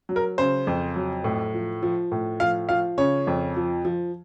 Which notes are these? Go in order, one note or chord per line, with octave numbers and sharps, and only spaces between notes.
F#3
A#4
C#3 C5
F2
F#3
A2
F3
F3
A2
F3 F5
F3 F5
C#3 C#5
F2
F3
F3